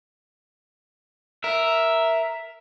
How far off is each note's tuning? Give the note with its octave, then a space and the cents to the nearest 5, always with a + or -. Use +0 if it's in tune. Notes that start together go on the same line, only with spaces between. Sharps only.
A#4 +0 E5 +0